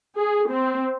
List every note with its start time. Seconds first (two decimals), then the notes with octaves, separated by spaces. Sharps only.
0.17 G#4
0.49 C4